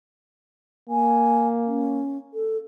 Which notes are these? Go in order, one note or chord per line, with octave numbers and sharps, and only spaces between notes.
A#3 G#5
C#4
A4